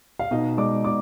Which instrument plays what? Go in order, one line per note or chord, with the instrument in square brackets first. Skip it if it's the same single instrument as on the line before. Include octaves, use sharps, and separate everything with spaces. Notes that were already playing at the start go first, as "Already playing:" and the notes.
[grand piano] F5
B2 D#4 D#5
G#3 D5 D6
B2 D5 D6